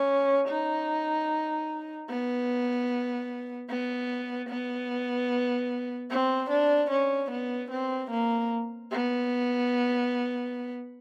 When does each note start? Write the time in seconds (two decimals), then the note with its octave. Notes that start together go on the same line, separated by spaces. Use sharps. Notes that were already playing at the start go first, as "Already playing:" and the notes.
Already playing: C#4
0.48 D#4
2.10 B3
3.70 B3
4.49 B3
6.10 C4
6.50 D4
6.91 C#4
7.31 B3
7.71 C4
8.11 A#3
8.91 B3